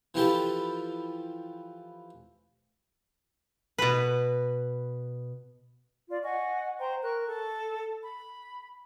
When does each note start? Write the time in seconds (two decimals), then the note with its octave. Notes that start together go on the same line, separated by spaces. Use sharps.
0.14 E3 F3 E4 F4 G4 A4
3.78 B2 B4
6.09 F4 D5
6.23 D#5 F#5 G#5 C#6
6.79 C5 G5 A#5 C6
7.04 A#4 C#6 F#6
7.27 A4
8.02 B5